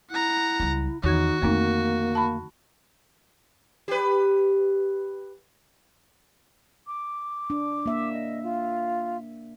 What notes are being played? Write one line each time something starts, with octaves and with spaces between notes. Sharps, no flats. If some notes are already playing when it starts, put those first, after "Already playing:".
E4 F#5 A#5
C#2 G3
E2 D#3 D#4 F#4 G#6
F2 D3 A3 A#3 C4 D#4
A5 B5
G4 B4
D6
D4
A#3 E5
D#5
F4